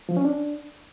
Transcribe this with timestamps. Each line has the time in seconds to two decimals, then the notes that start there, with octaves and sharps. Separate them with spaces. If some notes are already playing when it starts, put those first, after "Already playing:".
0.09 F3
0.17 C#4
0.25 D4